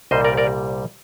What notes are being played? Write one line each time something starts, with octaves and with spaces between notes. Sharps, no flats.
C2 A#2 G3 C5 D#5
A#4 D5
A#4 D5